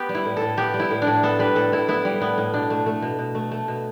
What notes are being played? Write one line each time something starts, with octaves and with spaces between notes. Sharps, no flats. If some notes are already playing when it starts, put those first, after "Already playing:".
Already playing: B3 G4
G3
E4
A2
A2 A4
B3 G4
G3
E4
A2
D4
A2
B3 A4
G3 B4
A2 A4
A2 E4
B3 E4
G3
A2 B3
A2
B2 D4
A3
A3
B2
B2
A3
A3
B2